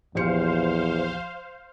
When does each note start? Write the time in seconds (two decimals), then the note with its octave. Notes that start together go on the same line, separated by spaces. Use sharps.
0.15 A#1 E2 G4 C5 F5 C#7